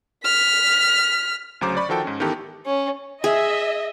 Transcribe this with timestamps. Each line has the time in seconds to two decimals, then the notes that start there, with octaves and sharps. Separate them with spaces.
0.24 F6 B6
1.61 D2 C#3 F#3 C5 A#5 D6
1.77 D5 B5 C#6
1.89 D#3 F3 F#4 A4 G5
2.04 G#2 C#4
2.20 D#3 E3 B3 D#4 G4 A4
2.66 C#4
3.24 G#4 D#5 E5